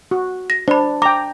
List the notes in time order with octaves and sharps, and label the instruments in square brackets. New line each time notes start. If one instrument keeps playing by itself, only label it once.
[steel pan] F#4
[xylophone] A#6
[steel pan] D4 [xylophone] C5 B5
[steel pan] G5 A#5 [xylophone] D6